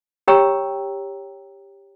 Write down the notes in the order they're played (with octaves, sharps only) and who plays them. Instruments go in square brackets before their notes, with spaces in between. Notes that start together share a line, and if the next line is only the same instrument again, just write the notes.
[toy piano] G4 C#5 G5 A#5 E6